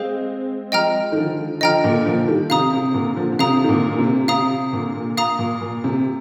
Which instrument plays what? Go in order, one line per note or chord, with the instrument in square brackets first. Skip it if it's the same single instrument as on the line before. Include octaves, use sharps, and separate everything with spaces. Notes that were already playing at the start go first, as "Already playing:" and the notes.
Already playing: [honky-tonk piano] G#3 C4 [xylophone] G#4 C5 F5
[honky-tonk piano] F3 G#3 [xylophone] D#5 G5 A#5 F6
[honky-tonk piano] D#3
D3 F3
[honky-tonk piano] D3 F3 [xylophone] D#5 G5 A#5 F6
[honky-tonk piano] A#2 D3
D3 F3
D#3 G3
[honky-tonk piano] C3 [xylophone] F5 A#5 D#6
[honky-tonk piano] C3
A#2 D3
D3 F3
D3
[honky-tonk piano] C3 [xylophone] F5 A#5 D#6
[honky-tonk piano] D#3
A#2 D3
C3
[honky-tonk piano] C3 [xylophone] F5 A#5 D#6
[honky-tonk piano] A#2 D3
[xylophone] F5 A#5 D#6
[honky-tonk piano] A#2
A#2
C3